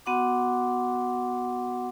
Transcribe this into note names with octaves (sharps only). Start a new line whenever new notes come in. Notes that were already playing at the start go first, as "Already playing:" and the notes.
B3 F#4 F#5 C6 D6